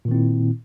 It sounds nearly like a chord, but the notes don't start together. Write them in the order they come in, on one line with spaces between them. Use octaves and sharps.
A#2 D#3 C4 E4